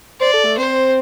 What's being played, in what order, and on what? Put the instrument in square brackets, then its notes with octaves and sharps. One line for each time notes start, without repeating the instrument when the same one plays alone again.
[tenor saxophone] C5 [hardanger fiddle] D5
[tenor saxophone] A4
A3
[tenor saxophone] C4 [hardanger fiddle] C5